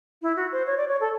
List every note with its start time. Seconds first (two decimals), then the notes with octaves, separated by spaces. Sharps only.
0.22 E4
0.36 F#4
0.52 C5
0.67 C#5
0.77 D5
0.89 C#5
1.00 A4